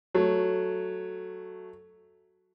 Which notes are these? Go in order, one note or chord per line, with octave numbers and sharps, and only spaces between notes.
F#3 A3